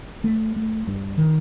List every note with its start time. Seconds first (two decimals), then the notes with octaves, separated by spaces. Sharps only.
0.24 A3
0.56 A3
0.87 G2
1.17 D#3